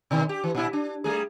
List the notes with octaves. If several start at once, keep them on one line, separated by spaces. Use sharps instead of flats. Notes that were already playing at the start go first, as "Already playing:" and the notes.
B2 D#3
G4
E3
A#2 E4
D4
G3 A3 G#4